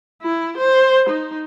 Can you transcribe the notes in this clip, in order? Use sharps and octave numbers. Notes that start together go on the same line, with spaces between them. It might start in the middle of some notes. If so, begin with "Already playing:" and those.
E4
C5
D#4